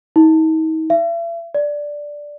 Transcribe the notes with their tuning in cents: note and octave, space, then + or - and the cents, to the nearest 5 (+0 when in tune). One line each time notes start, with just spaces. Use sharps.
D#4 +40
E5 +40
D5 +0